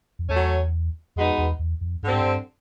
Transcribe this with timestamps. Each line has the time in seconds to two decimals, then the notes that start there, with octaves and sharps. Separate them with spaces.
0.19 F2
0.29 E2 F#3 A3 C#4
1.16 F2 B2 G#3 B3 D#4
1.38 E2
1.59 E2
1.81 F2
2.03 G2 D3 G3 C4
2.12 G#2
2.21 G2